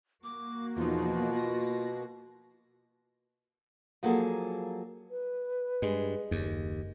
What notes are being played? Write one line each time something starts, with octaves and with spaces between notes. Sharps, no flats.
A#3 F#4 D6
E2 B2 F3 D#4 F4
A#6
F3 F#3 A#3 G#4 A4
B4
G2 G#3
F#1 D#2